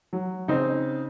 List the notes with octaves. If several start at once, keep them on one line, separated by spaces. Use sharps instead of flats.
F#3
C#3 C4 D#4